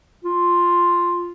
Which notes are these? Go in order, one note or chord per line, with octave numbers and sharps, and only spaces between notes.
F4